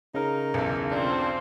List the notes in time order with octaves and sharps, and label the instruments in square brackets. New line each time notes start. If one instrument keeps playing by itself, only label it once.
[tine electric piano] C#3 A#4 [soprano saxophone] D#4
[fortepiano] B1 E2
[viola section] C4 F4 [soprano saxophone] D4